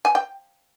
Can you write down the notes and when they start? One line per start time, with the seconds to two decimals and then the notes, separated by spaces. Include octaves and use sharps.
0.05 G#5
0.15 G5